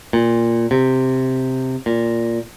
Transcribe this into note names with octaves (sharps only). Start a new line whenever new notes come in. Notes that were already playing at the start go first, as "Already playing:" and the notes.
A#2
C3
A#2